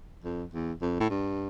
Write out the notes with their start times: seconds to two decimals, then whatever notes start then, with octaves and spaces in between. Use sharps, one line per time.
0.24 F2
0.53 E2
0.82 F2
1.00 A2
1.10 G2